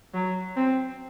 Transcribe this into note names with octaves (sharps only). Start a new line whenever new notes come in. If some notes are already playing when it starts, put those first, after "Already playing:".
F#3
C4